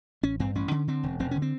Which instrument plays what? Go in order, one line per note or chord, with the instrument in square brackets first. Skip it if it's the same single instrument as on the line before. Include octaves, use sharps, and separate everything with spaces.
[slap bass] A1 C#4
G2 C4
A1 C#4
D3
D3 C4
E1
E1 C4
D3 C#4
C4